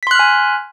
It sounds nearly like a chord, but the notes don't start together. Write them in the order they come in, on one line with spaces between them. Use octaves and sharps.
B6 C6 F#6 F6 G#5